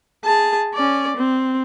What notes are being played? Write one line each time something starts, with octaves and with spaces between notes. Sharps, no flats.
G#4 A5
C#4 D5
C4